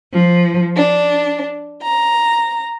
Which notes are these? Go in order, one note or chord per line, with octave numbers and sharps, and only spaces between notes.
F3
D4
A#5